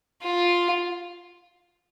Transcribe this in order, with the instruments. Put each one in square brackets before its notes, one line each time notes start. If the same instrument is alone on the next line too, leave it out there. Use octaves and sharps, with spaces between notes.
[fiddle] F4